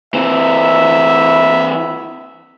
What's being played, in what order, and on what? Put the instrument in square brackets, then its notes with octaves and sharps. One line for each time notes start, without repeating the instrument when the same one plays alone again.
[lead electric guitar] E3 C4 [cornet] E5